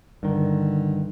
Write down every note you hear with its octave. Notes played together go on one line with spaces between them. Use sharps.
G2 D3 D#3